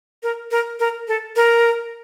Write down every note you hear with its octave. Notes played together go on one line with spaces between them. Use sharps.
A#4
A#4
A#4
A4
A#4